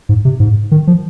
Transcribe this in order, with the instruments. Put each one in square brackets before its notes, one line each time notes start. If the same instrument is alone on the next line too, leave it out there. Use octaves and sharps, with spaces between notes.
[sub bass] G#2
C3
G#2
D#3
F3